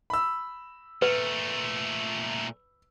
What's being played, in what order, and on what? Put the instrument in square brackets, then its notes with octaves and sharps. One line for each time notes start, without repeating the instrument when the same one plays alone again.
[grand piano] B5 E6
[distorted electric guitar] A#2 A3 [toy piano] B4